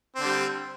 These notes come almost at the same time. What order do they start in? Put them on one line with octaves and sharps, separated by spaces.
C4 D3 G3